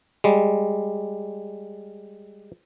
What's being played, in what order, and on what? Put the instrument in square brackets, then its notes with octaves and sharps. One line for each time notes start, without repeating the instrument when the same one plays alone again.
[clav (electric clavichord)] G3 G#3